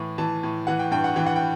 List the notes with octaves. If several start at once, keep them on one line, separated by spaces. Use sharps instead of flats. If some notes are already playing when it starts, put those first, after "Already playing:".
Already playing: A2 E3
E3 A5
A2
E3 F#5
G5
G2 G5
F#5
E3 G5
F#5
G5